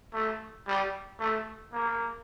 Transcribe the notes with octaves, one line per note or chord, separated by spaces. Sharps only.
A3
G3
A3
A#3